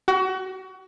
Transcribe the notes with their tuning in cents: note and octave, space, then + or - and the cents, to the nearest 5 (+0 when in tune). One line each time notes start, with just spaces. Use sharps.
F#4 +30